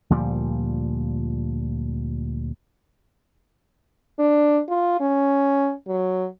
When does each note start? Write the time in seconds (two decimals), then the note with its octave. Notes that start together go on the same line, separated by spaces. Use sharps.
0.10 D2 A#2 F3 G3
4.19 D4
4.69 F4
5.00 C#4
5.88 F#3